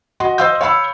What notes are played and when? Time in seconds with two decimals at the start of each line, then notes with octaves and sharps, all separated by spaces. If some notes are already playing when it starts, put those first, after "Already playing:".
0.20 F#4 D#5 C6
0.38 C5 D#5 F5 C6 E6 G6
0.61 C#5 F5 B5 E6